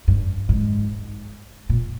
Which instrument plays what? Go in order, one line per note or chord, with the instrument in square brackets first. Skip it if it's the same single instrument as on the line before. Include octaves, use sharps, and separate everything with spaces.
[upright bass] G2
G#2
A#2